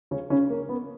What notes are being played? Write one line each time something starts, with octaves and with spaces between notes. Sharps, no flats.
C#3 C#4
C#3 C#4
A#3
B3